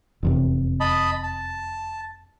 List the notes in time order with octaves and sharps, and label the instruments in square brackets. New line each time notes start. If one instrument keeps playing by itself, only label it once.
[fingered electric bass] F1 E2 C3
[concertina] D#5 A5 B5
A5